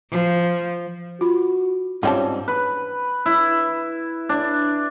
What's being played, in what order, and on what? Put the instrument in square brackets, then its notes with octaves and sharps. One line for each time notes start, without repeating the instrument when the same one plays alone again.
[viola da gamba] F3
[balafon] F4 B5 [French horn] F#4
[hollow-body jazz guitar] G#2 G3 C4 [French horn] C#4 [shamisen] F4 G5 A5
[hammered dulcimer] B4
E4
D4